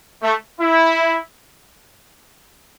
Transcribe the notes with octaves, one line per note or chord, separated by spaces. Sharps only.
A3
E4